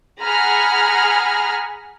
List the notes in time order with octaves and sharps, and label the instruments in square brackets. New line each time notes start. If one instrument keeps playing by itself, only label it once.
[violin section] G#4 F#5 A#5 B5 F6